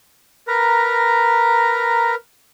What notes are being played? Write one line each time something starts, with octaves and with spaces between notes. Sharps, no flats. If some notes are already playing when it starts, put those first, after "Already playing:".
A#4 B4 A#5